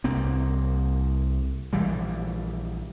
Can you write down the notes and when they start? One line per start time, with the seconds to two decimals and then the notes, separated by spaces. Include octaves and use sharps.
0.04 C2 A#3 C4
1.73 A#1 E3 G3